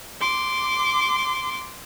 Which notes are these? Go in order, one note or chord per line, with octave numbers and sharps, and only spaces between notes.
C6 D6